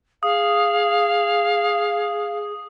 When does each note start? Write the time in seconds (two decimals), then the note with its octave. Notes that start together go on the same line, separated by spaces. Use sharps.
0.23 G#4 F5 D#6